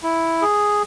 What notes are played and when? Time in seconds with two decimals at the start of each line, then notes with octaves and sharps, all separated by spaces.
0.03 E4
0.42 G#4